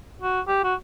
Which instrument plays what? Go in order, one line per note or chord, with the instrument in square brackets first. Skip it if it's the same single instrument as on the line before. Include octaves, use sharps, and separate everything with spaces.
[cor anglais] F#4
G4
F#4